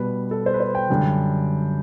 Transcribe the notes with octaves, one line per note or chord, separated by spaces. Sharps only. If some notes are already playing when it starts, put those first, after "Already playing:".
Already playing: B2 G3 B4
A4
C5
B4
C5
G5
F#2 D3 G3